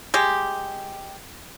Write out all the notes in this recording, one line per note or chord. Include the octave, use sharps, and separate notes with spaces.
G#3 G4